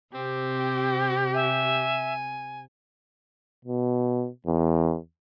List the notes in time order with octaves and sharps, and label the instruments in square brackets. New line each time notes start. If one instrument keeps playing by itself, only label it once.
[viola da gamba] C3 [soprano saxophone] C4 [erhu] G4
[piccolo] E5 [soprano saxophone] G#5
[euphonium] B2
E2